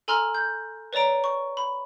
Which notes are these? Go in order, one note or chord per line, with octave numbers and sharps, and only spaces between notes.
A4 G#5 A#5 C6 F6
G6
B4 C#5 D5 A#5 D7
C#6
B5